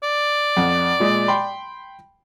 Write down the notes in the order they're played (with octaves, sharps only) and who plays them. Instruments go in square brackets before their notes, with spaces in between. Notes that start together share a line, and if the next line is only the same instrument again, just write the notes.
[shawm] D5
[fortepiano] F2 F#5
A#2 G#3
G5 B5 C6